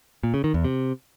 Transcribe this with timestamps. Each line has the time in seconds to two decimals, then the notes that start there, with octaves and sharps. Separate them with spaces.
0.23 A#2
0.34 C#3
0.44 D#3
0.54 E2
0.64 C3